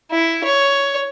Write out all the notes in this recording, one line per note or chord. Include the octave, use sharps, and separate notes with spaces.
E4
C#5